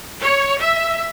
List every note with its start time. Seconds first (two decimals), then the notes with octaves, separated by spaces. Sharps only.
0.22 C#5
0.60 E5